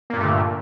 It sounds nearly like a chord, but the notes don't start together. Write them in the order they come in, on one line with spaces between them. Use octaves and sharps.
A#3 A#2 G2 A3 D3